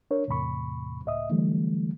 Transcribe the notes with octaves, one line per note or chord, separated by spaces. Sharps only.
D4 A#4 C#5
E2 A2 C3 B5 C#6
C#2 A2 D#5 E5 D#6
D3 E3 F#3 G3 A3